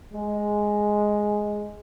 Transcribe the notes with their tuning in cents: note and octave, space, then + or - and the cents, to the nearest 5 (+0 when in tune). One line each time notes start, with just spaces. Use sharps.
G#3 +5